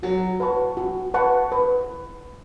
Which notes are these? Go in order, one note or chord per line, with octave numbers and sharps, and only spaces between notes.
F#3 F#4
B4 F#5 A5 C#6
F#4
B4 F#5 A5 C#6
B4